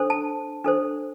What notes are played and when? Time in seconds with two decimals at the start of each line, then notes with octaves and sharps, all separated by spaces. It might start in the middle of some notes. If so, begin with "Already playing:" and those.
Already playing: D4 A4 C5
0.10 A5
0.64 D4 A4 C5